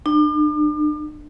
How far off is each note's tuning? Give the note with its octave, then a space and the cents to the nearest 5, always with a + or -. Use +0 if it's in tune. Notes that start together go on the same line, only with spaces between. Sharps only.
D4 +40